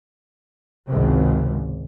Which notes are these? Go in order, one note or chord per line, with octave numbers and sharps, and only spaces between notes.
G#1 C#2 C3